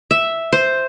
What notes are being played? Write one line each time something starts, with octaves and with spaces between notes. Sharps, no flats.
E5
C5